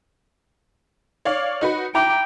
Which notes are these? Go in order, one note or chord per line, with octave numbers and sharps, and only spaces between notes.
C#5 D5 F5
D#4 F#4 B4
E4 G5 A#5 D6